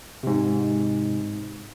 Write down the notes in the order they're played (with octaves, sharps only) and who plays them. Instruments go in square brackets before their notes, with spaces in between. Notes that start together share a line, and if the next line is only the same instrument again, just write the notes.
[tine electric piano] G#2 C3